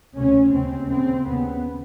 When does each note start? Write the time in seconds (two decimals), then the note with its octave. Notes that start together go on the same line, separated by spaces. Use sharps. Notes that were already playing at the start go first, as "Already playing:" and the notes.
0.16 D2 C3 C#4
0.52 D#2 C#3 C4
0.89 D#2 C#3 C4
1.26 D#2 C#3 B3